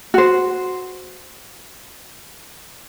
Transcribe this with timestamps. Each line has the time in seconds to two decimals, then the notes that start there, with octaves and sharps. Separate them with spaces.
0.14 F#4 C5